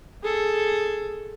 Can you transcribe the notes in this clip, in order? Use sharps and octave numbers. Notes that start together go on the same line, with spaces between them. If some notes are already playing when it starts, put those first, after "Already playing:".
G#4 A4